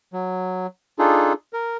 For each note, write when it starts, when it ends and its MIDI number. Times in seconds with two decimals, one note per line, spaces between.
0.13 0.67 54
0.99 1.33 62
0.99 1.33 63
0.99 1.33 65
0.99 1.33 68
0.99 1.33 69
1.53 1.77 70